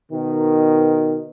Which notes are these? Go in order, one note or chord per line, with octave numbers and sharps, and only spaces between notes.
B2 D#3